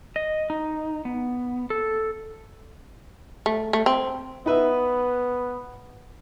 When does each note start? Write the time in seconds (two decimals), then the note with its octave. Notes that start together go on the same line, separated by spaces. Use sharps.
0.16 D#5
0.50 D#4
1.05 B3
1.70 A4
3.46 A3
3.73 A3
3.86 C4
4.46 B3 D#4 B4 E5